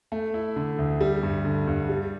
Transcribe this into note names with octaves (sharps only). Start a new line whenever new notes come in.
A3
E4
D3
D2
G3
G2
D3
G2
G3